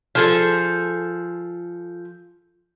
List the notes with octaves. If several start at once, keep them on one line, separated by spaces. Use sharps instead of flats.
F3 G#4 A4